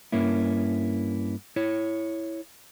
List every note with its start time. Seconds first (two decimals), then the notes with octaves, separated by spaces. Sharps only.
0.12 G2 A#3 C#4 E4
1.56 E4 C#5